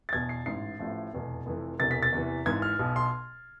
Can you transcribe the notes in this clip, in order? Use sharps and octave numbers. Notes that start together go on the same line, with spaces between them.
A6
E2 B2 G#6
C7
A1 G#2 E3 C7
A1 A2 F3
F1 E2 B2
F1 F2 E3
E1 E2 C3 E3 A6
B6
A6
E2 C3 E3
G#1 G#2 E3 G#6
F6
B1 B2
C6